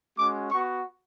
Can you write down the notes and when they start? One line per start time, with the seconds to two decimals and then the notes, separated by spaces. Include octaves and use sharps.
0.18 G#3 C#4 F#4 D6
0.51 B3 F#4 C#6